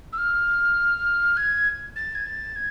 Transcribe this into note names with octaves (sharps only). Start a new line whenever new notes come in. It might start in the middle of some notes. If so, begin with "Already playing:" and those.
E6
F6
G#6
A6
G#6
A6
G#6